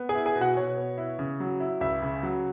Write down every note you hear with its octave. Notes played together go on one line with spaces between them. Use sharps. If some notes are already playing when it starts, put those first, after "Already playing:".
Already playing: B3
G#4 G#5
E4
G#4 G#5
B2
F#4 F#5
B2 C#5
B3
E4
C#3
F#3
E4
C#2 E5
C#3
F#3